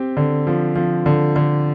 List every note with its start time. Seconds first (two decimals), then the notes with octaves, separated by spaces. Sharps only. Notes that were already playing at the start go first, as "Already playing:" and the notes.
Already playing: C4 G4
0.17 D3
0.47 F3
0.76 F3
1.06 D3
1.36 D3